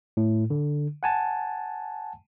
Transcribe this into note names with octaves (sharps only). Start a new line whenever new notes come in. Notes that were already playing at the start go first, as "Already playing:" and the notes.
A2
D3
F#5 G#5 A5